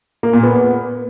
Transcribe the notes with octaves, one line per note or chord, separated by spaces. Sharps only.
A#3
A#2
B3
B3